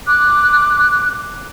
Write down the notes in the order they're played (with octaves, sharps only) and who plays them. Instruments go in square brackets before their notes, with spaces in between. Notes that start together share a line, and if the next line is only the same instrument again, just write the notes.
[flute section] D6 F#6